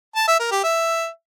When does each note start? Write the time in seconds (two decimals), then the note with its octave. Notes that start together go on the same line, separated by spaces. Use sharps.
0.16 A5
0.28 E5
0.40 A#4
0.51 G4
0.63 E5